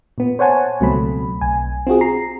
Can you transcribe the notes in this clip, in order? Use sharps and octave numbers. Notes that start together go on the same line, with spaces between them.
A#2 B3
C5 C#5 F#5 G#5 A5
C#2 B2 F#3 A3 C4 B5
B1 G#5
C4 F4 F#4 G#4
A#5 C7